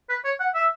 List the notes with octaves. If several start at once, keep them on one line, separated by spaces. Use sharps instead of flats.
B4
C#5
F#5
E5